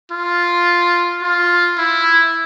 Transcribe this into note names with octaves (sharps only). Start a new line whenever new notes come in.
F4
F4
E4